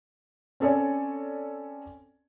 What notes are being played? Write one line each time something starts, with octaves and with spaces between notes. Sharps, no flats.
C4 C#4 A4 C#5 D5 G#5